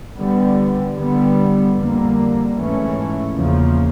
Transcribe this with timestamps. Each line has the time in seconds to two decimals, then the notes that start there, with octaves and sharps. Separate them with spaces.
0.17 D3 G3 B3
0.96 D3 G3 B3
1.75 F2 D3 G3 A#3
2.54 G#2 E3 A3 C#4
3.33 E2 C#3 F3 A#3